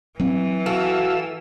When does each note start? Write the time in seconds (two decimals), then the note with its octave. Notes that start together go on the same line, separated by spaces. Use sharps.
0.20 E3 F#3 C4
0.66 F#4 A4 F5 E6